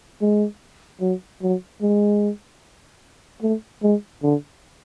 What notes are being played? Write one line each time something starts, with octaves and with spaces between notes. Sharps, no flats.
G#3
F#3
F#3
G#3
A3
G#3
D3